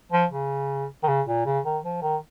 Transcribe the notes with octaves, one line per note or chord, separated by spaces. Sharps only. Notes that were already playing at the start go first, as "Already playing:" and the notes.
F3
C#3
D#3
C#3
A#2
C#3
D#3
F3
D#3